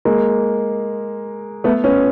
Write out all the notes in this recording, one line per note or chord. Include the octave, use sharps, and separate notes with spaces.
G#3 A#3
A3 B3
B3 C#4